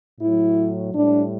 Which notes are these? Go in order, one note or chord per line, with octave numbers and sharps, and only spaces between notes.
A2 F#3 E4
A2 G3 D4